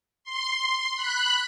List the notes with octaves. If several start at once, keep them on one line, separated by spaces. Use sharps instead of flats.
C6
B5 F#6